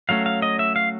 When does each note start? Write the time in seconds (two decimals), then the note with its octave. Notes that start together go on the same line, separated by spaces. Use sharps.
0.09 F#3 A3 C#4 F5
0.26 F5
0.42 D#5
0.59 E5
0.76 F5